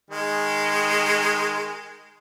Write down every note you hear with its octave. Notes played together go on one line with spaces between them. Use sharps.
D#3 G#3